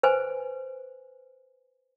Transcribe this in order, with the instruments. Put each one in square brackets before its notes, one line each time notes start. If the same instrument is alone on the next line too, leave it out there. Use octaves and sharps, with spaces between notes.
[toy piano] B4 C5 G#5